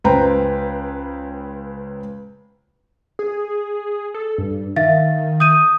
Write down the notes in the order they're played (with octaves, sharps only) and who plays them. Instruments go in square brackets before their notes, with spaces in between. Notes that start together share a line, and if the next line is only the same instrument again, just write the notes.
[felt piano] C#2 B4 C5 G5 A#5
[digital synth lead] G#4
A4
G2
[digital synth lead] D#3 [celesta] E5 F5 A6
[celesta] D#6 G6 D#7